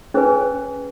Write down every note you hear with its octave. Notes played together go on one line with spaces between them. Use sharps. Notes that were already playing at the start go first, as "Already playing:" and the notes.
C#4 G#4 B4 G#5